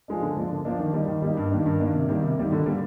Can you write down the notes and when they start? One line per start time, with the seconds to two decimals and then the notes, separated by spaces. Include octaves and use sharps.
0.08 F3 G#3 D4
0.22 D3
0.37 F3 A#3 D4
0.51 D3
0.65 F3 A#3 D4
0.79 D#3
0.94 G3 A#3 D#4
1.08 D#3
1.22 G3 A#3 D#4
1.37 G2
1.51 D#3 A#3 D4
1.66 G2
1.80 D#3 A#3 D4
1.94 C3
2.09 D#3 G3 A#3
2.23 C3
2.38 D#3 G3 A#3
2.52 D3
2.66 G3 A#3